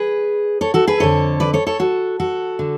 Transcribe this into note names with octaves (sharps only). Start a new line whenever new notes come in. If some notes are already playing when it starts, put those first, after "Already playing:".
Already playing: G#4 B4
A4 C#5
F#4 A4
G#4 B4
F2 D3 A4 C#5
B4 D5
A4 C#5
A4 C#5
F#4 A4
F#4 A4
D3